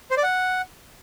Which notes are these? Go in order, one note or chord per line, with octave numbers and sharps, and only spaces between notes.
C5
D5
F#5